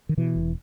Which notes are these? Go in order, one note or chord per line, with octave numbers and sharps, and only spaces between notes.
D#3
B2 E3
E1